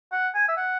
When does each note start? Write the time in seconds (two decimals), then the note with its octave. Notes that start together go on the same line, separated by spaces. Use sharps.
0.12 F#5
0.35 G#5
0.49 E5
0.57 F#5